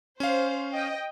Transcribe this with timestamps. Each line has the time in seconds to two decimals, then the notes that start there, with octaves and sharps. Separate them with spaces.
0.20 C#4 C5 F5
0.73 D#5 G5